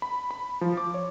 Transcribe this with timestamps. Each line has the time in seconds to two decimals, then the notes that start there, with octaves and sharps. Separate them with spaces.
0.02 B5
0.31 B5
0.61 F3
0.77 D6
0.94 C#5